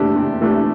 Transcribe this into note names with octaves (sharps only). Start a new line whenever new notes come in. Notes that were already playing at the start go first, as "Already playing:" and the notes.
Already playing: C3 E3 A3 D4 G4
C3
E3 A3 D4 G4